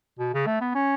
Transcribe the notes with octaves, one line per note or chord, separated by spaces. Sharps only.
B2
C#3
A3
B3
C#4